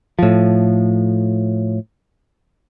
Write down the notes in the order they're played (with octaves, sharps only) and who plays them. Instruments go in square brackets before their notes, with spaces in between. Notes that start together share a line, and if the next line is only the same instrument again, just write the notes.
[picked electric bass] A2 F3